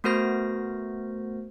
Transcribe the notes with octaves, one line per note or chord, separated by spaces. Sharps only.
A3 B3 F#4 A#4 C5 A#6